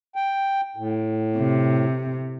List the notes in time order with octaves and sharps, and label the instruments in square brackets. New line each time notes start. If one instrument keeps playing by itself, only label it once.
[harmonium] G5
A2
[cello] C3